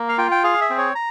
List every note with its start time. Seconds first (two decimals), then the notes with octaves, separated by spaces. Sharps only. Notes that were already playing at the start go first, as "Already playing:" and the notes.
Already playing: A#3
0.09 F5
0.18 F4 G5
0.31 G5
0.44 G#4 F5
0.61 E5
0.70 C4
0.78 C#5
0.95 A#5